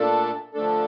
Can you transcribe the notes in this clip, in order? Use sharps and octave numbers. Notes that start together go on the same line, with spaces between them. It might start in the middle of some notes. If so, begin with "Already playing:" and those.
Already playing: A#2 A3 D4 A4
D3 F3 A3 D4 A4